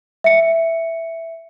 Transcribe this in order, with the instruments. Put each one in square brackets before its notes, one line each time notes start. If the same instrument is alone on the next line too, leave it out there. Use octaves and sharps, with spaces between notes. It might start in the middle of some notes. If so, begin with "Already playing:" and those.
[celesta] E5 C#7